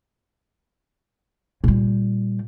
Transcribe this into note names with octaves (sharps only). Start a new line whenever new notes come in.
A#2 G3